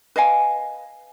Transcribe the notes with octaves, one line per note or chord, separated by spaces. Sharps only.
B4 D#5 F5 G#5